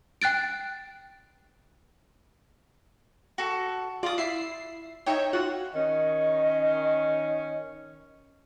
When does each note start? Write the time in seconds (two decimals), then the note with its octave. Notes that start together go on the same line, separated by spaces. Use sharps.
0.22 G5 F#6 A6 D7
3.38 F#4 A4
4.03 F4 D5 D#6
4.18 E4 E5 C7
5.06 D#4 C#5 E5 G5
5.33 F4 F#4 F#5
5.74 D#3 C#4 D#5